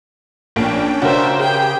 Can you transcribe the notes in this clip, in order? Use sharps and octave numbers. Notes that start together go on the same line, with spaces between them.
A#1 A#3 C#4 D4 G5 D7
C#3 F#4 A#4 C5 E5
G4 G#4 G5